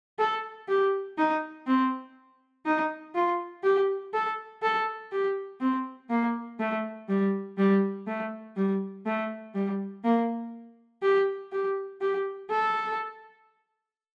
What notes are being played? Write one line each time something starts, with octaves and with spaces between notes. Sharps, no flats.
A4
G4
D#4
C4
D#4
F4
G4
A4
A4
G4
C4
A#3
A3
G3
G3
A3
G3
A3
G3
A#3
G4
G4
G4
A4